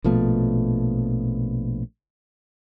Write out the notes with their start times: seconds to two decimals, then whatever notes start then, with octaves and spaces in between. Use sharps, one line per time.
0.04 A#1 B2 F3 A3